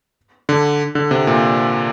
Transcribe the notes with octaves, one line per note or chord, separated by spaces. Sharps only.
D3
D3
C3
A#2